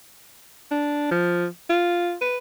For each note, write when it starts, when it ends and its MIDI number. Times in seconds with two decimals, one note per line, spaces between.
0.71 1.08 62
1.11 1.47 53
1.70 2.16 65
2.21 2.37 71